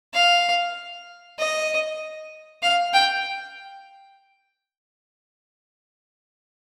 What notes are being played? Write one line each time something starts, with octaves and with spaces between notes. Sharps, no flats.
F5
D#5
F5
G5